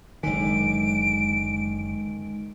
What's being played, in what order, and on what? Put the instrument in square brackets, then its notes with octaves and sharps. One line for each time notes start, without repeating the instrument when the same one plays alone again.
[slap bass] F#1 D3 [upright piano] D#3 [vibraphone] G#3 [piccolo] D7